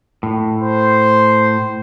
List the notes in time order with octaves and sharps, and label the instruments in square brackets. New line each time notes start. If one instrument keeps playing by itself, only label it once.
[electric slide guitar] A2
[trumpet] C5